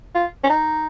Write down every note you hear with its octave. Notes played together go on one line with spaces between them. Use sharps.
F4
C#4
D#4